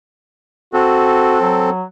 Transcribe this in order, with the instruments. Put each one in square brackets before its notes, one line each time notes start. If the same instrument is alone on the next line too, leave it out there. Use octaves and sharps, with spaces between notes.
[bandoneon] C4 A4 [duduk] F#4
[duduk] F#3